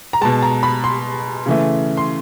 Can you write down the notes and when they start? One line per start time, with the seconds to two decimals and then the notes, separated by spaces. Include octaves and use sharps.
0.13 A#5
0.21 B2 G#3 A5
0.42 A#5
0.63 B5
0.84 C6
1.46 C#3 E3 A3
1.97 C6